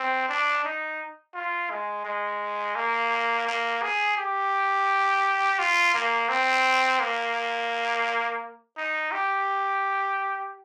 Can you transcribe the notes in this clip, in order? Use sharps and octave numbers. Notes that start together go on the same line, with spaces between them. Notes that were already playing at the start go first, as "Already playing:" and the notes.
Already playing: C4
D4
D#4
F4
G#3
G#3
A#3
A#3
G#4
G4
F4
A#3
C4
A#3
D#4
G4